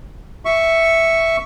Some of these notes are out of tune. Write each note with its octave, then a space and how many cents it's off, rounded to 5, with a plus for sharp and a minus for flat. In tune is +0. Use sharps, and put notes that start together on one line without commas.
E5 +0 C#6 +0